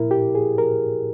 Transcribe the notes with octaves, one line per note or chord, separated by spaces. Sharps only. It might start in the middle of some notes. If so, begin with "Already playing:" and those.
Already playing: A#2 E4 A#4
G4
G#4
A#4